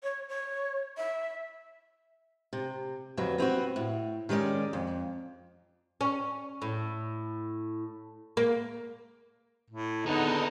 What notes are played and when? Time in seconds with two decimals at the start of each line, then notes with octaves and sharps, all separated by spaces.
0.03 C#5
0.29 C#5
0.98 E5
2.53 C3
3.17 F2 D3 F#3 B3
3.38 B3 C4 F4 F#4
3.76 A2
4.29 D#3 G3 G#3 C#4 D5
4.73 F2
6.01 C#4
6.62 A2
8.37 A#3
9.70 A2
10.06 D3 B3 D#4 G#4 B4